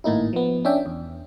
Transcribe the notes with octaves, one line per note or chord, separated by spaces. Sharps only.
G#1 A2 A#3 D#4 E4
F3 B3
C#4 D4 D5 E5 G5
E2